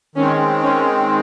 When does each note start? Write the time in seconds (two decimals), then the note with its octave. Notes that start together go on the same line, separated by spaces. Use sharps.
0.15 D#3 G#3 C4 C#4
0.62 C#4